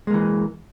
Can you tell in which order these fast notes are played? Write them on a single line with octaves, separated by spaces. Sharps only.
G#3 A#3 E3